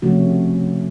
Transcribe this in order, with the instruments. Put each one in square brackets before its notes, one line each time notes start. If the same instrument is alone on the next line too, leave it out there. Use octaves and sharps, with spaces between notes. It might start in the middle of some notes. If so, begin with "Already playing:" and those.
[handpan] C3 F3 A3 C#4 F#4